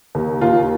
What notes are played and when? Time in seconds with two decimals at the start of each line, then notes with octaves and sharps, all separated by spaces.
0.15 D#2
0.41 D#2 F4